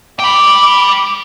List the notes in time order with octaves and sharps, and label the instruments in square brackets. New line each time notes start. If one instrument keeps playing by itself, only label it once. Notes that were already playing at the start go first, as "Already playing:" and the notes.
[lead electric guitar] G5 B5 [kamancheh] D6